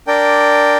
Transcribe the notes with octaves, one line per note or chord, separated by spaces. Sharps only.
D4 A#4 D5 G5